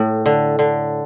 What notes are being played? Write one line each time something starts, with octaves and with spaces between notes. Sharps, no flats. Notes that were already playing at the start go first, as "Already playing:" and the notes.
Already playing: A2
D3
D3